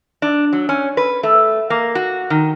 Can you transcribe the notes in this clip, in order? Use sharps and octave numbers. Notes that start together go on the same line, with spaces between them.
D4
F#3
C#4
B4
A3
A#3
F#4
D#3